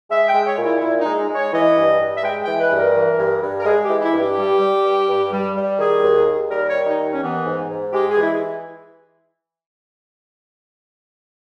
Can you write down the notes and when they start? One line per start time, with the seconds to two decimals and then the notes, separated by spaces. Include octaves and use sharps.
0.10 G#3 E5
0.28 G5
0.34 G#3
0.46 C#5
0.58 A#2
0.64 E4
0.81 A#2 E4
0.99 D#4
1.06 G#3
1.29 G#3
1.35 C#5
1.53 E3 D#5
1.77 G2
2.00 G2
2.16 E5
2.23 G#3 G5
2.42 G5
2.48 E3
2.60 B4
2.71 G2
2.77 A#4
2.95 E3
3.19 G2
3.43 G2
3.60 A#4
3.66 G#3 G#4
3.84 G4
3.90 E3
4.02 E4
4.14 G2
4.19 G4
4.37 G3
4.61 G3
4.85 G2
5.09 G2
5.32 G3
5.56 G3
5.79 D#3 G#4
6.03 D#2
6.26 D#2
6.51 G3 A#4
6.68 C#5
6.75 D#3
6.86 D#4
6.99 D#2
7.12 C#4
7.22 E3 B3
7.45 G#2
7.70 G#2
7.93 G#3 G4
8.11 G#4
8.17 E3 E4